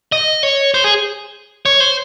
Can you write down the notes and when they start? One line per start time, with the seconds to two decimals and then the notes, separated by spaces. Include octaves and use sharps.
0.12 D#5
0.43 C#5
0.74 C5
0.84 G#4
1.66 C#5
1.80 C5